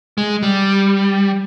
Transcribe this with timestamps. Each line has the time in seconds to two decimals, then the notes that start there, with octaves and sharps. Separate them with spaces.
0.18 G#3
0.43 G3